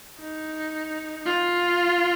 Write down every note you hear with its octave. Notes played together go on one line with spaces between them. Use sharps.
D#4
F4